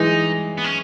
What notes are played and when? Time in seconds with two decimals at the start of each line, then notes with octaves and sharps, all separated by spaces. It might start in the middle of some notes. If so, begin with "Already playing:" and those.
Already playing: E3 G#3 D#4
0.58 B3
0.64 C#4